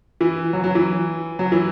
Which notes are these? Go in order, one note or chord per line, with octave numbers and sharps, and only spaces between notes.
E3
F#3
F#3
E3
F#3
E3